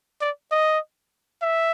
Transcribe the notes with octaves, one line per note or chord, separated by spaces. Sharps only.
D5
D#5
E5